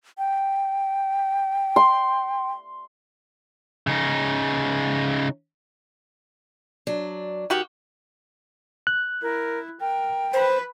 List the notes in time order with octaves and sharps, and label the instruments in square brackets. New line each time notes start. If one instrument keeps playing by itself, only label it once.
[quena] G5
[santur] C6
[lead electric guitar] C#3 D#4
[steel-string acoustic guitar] F#3 D4
[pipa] D#3 F#4 G4
[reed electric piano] F#6
[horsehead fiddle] E4 [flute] A#4
[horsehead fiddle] A#4 [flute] G5
[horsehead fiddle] B4 B5 [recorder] C5